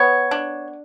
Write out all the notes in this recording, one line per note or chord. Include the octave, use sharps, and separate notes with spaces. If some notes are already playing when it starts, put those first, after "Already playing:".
Already playing: B3 C#5
D4